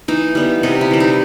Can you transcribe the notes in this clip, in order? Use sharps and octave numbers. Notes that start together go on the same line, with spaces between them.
E3 D#4
G3 B3
C3 D#4
E4
E3 G3
D#4